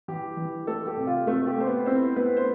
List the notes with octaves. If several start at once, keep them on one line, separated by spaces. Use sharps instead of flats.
E3 G4
E3
G3 A3 A4
G4
C3
F4
A3 C4 A4
G4
A3 C5
B3 B4
C4 E4 C5
A3 B3 B4
C5